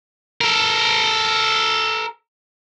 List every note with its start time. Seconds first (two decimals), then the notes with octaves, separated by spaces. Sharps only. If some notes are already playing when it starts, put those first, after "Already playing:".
0.41 A4 A#4